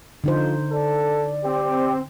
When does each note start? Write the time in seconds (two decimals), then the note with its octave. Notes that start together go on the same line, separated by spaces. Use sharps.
0.24 D3 F3 D#4 C5
0.72 A4 D5
1.44 C4 G4